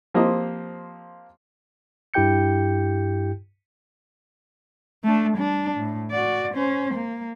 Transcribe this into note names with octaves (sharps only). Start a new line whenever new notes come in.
F3 A#3 C4 G4 C5 D#5
G2 E4 G4 G5 G6 C#7
A3 D4
G3 D4
A2
F#4 D5
C#4 C5
A#3